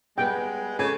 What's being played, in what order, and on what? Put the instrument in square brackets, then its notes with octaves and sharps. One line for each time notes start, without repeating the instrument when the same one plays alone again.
[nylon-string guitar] G3 B3 B4 [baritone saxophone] G#3 [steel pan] G5
[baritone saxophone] C#3 [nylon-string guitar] A4 C#5 [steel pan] G#5